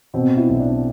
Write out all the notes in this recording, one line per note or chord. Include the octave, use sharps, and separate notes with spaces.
B2 C4
E4
B1
D4